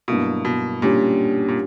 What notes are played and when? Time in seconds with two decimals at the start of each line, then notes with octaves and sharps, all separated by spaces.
0.08 G2 B2 F#3 A#3 E4
0.45 B2
0.82 A#2 D3 G3 C#4 G4
1.48 A#2